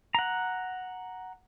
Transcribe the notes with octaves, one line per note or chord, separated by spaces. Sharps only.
F#5 A#5